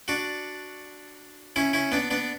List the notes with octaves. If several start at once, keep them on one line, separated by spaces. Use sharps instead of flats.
D4 F#4
C#4 E4
C#4 E4
B3 D4
B3 D4